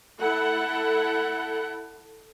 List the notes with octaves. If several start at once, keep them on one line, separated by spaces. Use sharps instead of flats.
E4 A4 F#5